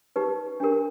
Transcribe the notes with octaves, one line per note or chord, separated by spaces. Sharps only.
D#4 G4 B4
D4 G4 A#4